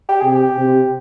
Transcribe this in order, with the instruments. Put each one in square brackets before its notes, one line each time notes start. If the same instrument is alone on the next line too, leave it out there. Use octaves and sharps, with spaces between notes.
[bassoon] G4
G#4
[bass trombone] C3 [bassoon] G4
[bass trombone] C3